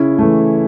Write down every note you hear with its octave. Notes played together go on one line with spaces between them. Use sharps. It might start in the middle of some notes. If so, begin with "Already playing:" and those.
Already playing: C#3 C#4 E4
E3 A3